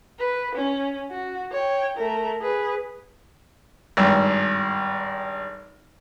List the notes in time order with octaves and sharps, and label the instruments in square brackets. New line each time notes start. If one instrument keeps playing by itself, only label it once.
[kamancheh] B4
C#4
F#4
C#5 G5
A3 A#4
G#4 B4
[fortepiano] G#1 G2